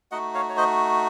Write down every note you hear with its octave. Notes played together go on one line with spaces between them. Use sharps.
A3 D#4 F#4 D#5 F#5
C#5 F5
C#5
C5 D#5